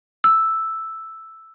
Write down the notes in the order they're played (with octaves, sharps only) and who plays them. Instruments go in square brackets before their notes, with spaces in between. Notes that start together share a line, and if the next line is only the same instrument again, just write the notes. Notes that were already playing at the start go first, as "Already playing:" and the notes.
[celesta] E6